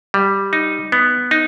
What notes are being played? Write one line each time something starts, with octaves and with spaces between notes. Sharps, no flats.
G3
D#4
B3
D#4